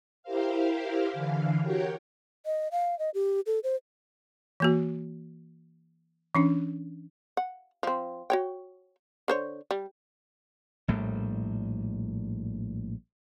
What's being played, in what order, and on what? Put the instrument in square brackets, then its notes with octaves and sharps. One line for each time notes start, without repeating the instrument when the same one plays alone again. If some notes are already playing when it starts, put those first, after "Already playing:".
[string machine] E4 G4 A#4 C5 F5
D3 E3 F5
F#4 G4 A#4 C#5 G5
[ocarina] D#5
F5
D#5
G4
A4
C5
[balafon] E3 A#3 F#4
E3 C#4 D4
[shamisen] F#5
F3 C4
F#4 C#5 G5
D3 C5 C#5
G3
[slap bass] A#1 A2 G3